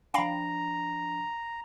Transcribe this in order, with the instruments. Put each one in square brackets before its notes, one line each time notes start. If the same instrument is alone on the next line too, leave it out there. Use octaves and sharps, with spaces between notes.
[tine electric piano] F3 D4 [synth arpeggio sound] F5 G5 B5 [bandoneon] A#5